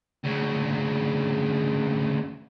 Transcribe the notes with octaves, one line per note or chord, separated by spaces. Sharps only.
D2 C#3